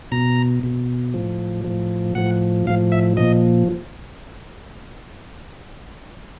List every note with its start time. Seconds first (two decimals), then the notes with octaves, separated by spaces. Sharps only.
0.12 B2 A#5
0.63 B2
1.14 A2 F3
1.65 A2 F3
2.15 A2 F3 F#5
2.67 A2 F3 F5
2.92 E5
3.17 A#2 F3 D#5